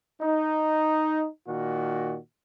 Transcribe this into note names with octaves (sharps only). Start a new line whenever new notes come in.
D#4
A#2 D#3 F#4